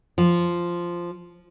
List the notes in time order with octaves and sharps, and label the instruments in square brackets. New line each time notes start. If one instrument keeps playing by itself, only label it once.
[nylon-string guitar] F3